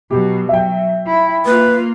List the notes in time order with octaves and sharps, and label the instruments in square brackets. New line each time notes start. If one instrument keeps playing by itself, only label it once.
[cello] B2 F#3 [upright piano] G4
[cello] F#3 [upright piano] E5 G5
[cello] E4
[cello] A#3 F4 [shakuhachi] B4